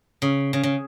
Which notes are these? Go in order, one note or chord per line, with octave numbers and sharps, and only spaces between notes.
C#3
C#3
C#3